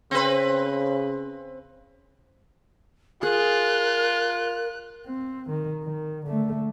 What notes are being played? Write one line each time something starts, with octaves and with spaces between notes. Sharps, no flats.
C#3 C4 B4
F4 G#4 A#4 F#6
C4
D#3
D#3
D3 A3